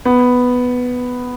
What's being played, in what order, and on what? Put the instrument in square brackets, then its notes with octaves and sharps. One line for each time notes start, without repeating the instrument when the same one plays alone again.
[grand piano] B3